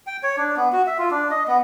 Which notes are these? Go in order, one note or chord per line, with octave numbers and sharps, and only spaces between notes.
G5
C#5
D4
B3
F#4
E5
F4
D4
D#5
B3